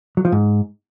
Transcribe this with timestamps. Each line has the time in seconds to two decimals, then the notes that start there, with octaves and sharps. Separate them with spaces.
0.17 F#3
0.25 F3
0.32 G#2